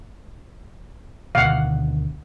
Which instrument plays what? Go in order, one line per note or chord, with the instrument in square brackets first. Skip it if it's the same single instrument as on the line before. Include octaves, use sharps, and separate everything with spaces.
[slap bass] D2 B2 D#3 [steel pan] F5 F#5